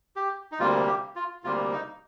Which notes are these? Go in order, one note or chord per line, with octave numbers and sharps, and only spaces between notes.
G4
D#4
D2 C3 G3 A#3 F4
G4
F4
D2 C3 G3 A#3 F4
D#4